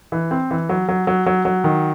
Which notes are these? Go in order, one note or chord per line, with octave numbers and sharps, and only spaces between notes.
E3
C4
E3
F#3
F#3
F#3
F#3
F#3
D#3